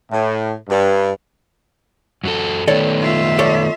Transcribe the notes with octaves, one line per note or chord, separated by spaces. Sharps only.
A2
G2
F#2 F#3 A4
D#3 A3 B3 A4 C#5 D5
F4 E5
A4 C#5 D5